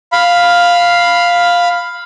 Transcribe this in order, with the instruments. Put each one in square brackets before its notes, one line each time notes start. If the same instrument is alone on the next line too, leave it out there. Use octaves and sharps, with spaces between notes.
[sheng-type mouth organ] F5 B5